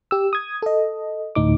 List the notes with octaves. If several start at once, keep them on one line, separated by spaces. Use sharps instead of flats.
G4 E6
D#6 G#6
A4 D#5
D2 A2 D#4 D6